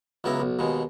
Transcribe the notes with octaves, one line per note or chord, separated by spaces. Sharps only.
C#2 F#3 B3 E4 A#5
B1
D#2 B2 G#3